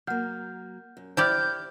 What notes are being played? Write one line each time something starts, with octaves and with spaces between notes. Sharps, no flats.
F#3 A#3 F#5 F6 G6
F#2
E4 G4 C5 D5 F6 G6